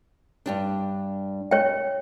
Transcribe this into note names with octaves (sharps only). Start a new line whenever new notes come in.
G2 G3 D4
C#5 G5